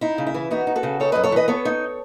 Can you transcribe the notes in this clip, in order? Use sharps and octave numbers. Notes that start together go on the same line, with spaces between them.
D#4 E4
C#3
E4
E3
B3 D#4 F#4
D#4
F#4 A4
C#3
D#4 A4 C#5
F#2 B4 D#5
A4 C#5
E3 B4 D#5
B3 A4 C#5
D#4